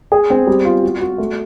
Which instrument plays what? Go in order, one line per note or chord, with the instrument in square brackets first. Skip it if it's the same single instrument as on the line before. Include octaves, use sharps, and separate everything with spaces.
[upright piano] G#4
C4
G3
F4
F#4
F#4
A3